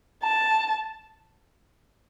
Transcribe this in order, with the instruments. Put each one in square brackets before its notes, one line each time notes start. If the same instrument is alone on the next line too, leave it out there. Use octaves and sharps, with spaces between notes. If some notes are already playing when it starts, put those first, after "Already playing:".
[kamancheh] A5